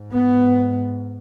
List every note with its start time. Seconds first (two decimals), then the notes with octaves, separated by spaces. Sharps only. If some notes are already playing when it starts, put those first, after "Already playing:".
Already playing: G#2
0.13 B3